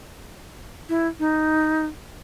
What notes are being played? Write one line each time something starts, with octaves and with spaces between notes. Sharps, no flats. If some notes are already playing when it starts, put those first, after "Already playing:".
E4
D#4